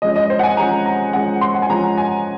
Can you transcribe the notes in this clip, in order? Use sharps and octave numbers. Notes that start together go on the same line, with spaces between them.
F3 G#3 C#4 D#5
D#5
C5
F#5
G#5
F3 G#3 C#4 A#5
A#5
F3 G#3 C#4 F#5
C6
F#5
G#5
F3 G#3 C#4 A#5
G#5